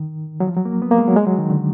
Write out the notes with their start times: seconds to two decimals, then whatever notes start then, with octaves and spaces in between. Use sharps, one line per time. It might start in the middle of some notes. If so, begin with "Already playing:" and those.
Already playing: D#3
0.40 F#3
0.47 F3
0.57 F#3
0.65 A#3
0.82 B3
0.91 A#3
0.98 G#3
1.08 F#3
1.16 G#3
1.27 F#3
1.38 D#3
1.50 D3